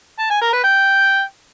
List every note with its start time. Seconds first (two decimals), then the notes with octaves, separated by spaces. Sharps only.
0.19 A5
0.30 G#5
0.42 A#4
0.53 B4
0.64 G5